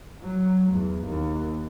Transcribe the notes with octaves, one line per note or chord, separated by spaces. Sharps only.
F#3
E2
D#2